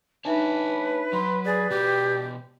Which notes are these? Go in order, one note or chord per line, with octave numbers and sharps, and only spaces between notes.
D4 D#4 B4 C#5 E5 G#5 A5
F#3 B5 C6
G#4 D5 A6
B2 F#4 G4 G5